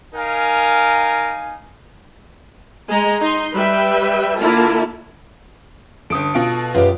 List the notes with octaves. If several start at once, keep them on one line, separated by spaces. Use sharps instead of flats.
D#4 A#4 F5 G#5
G#3 D#5 A#5
D#4 D#5 C6
G3 B4 E5 G5
D3 A#3 E4 F4 A#4 A5
G1 A4 D#6 D7
B2 F4 D7
F#2 F4 G4 B4